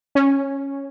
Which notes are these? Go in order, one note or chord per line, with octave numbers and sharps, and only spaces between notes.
C#4